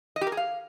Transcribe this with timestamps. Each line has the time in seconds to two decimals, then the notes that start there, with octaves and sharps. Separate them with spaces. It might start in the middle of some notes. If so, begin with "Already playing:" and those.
0.16 D#5
0.21 G4
0.27 A#4
0.32 G#4
0.37 F5